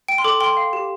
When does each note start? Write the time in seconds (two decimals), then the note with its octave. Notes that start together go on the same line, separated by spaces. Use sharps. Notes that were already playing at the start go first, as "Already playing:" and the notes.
0.08 G5 D7
0.18 C6
0.24 A4 D6
0.40 G5 C6
0.57 F5
0.73 G4